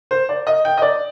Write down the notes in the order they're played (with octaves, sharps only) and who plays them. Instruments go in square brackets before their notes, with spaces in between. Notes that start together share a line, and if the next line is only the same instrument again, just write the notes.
[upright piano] C5
D5
D#5
G5
D#5
D5